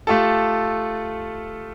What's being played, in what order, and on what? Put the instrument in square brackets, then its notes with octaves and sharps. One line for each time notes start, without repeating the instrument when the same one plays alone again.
[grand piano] A3 F4 G4 A4